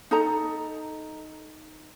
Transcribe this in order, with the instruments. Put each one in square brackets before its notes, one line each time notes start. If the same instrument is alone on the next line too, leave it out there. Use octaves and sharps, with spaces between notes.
[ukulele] D#4 A4 A#5